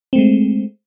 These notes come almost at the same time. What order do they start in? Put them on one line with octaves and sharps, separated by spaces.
C4 A3 G#3